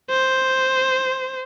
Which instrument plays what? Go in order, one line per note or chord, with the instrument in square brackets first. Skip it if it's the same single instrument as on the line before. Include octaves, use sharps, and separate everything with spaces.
[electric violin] C5